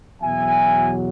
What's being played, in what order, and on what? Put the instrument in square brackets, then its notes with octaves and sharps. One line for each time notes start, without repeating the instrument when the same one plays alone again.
[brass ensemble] E2 B2 F#3 E5 G#5